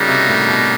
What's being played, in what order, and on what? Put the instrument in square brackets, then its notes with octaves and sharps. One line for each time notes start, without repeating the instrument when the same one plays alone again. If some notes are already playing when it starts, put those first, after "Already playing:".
Already playing: [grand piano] C#3 [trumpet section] G3 A#3 D#4 F#4
[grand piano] C3
A2
B2